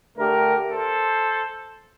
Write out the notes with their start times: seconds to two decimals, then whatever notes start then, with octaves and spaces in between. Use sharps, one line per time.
0.17 D3 A3 G4 A#4
0.70 A4 C5